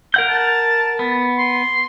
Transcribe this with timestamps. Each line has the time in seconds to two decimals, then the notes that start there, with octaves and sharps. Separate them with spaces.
0.14 A#4 F#5 G6
0.29 A5
0.99 B3
1.38 C6